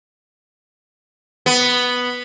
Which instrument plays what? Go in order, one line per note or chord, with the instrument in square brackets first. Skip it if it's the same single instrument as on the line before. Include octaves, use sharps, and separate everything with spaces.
[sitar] B3